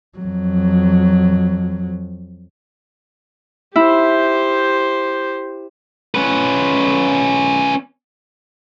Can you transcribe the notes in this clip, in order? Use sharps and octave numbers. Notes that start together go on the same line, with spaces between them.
F2 F#3
E4 G4 C5
C#4 B4